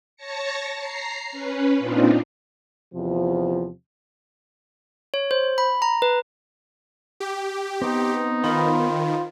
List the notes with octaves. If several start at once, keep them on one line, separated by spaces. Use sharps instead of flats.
C#5 A5 A#6 C#7
A#5 C7
C#4 B4
A#2 C4 D4 D#4 F4
E2 C3 F3
C#5
C5
B5
A#5
B4
G4
B3 C4 D#4
D#3 F4 C5 B5